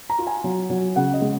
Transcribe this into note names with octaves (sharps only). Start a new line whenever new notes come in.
A#5
F4
G#5
F#3
F#3
C#3 F#5
D#5
G#3